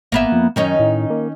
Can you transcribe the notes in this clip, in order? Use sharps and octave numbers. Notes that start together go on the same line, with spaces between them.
G#1 A#3 B3 E5
F2
F#2 D#3 C#4 D#4
A2
A#3